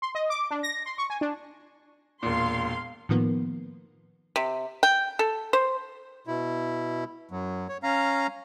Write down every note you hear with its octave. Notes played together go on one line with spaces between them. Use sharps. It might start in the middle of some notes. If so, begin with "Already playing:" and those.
C6
D#5
D6
D4
A#6
C6
C#6
G#5
D4
E1 A#2 F5 C6
A2 D#3 F3 A#3 B3
C3
G5
A4
C5
B2 E4
F#2 F#3
C#5
C#4 F5 A#5